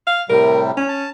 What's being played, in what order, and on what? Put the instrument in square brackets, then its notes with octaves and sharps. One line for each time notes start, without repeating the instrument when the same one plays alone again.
[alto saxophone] F5
[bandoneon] A2 C3 G3 [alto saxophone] A#4
[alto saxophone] C#4
[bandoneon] A5